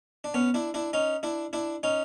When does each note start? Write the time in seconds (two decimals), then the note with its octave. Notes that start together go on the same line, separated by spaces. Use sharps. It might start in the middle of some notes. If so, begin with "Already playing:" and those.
0.24 D4
0.34 B3 C#4
0.54 D4 E4
0.74 D4 E4
0.93 C#4 D#4
1.23 D4 E4
1.53 D4 E4
1.83 C#4 D#4